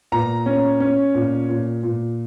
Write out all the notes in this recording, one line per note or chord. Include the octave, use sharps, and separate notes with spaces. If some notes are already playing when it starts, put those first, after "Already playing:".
A#2 A#5
C#4
C#4
A#2
A#2
A#2